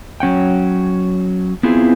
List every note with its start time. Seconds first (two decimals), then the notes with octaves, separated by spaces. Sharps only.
0.20 F#3 C#4 F#5 G5
1.63 B3 C4 E4 F4 G#4